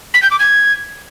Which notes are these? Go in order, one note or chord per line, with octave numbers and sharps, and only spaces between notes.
B6
G6
D6
G#6